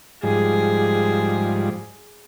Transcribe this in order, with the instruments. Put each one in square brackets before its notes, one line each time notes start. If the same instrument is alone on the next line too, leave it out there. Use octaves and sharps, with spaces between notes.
[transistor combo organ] G#2 F3 G3 [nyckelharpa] G#4